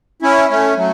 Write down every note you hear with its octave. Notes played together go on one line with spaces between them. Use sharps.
C#4 E4
A3 C#4
F#3 A3